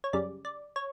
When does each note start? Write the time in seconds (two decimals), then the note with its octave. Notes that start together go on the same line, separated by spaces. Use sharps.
0.04 C#5
0.13 F#2 C#3 G3 D5
0.45 D5
0.76 C#5